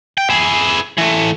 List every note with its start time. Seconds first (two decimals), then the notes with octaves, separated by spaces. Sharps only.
0.18 G5
0.30 E4 G#4
0.97 E3 A3